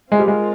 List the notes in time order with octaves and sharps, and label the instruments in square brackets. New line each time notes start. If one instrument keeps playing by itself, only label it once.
[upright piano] G#3 [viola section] C4 F4 A#4 F5
[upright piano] G3
G#3